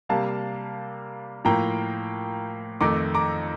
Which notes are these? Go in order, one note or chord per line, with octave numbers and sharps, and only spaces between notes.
C3 G3 A#3 F5 A5
A2 F3 A#3 G5 A#5
F2 D#3 A3 A#5 D6
A#5 D6